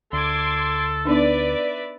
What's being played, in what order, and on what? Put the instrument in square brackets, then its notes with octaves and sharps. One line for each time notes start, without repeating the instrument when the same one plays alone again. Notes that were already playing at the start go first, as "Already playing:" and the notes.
[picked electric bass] D2 [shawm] A4 [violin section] C6 D6 G#6
[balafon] B3 D4 D#4 [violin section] B4 D5 E5